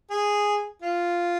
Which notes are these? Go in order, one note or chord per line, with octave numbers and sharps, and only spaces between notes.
G#4
F4